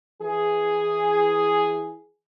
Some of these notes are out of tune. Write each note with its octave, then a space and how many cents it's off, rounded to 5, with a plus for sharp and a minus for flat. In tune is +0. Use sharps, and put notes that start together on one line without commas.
E3 +0 G#4 +0